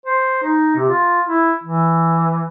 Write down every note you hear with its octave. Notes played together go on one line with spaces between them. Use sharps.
C5
D#4
C3
F4
E4
E3